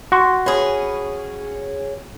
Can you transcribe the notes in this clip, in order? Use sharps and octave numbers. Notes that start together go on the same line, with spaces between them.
F#4 C6
C#4 G#4 B4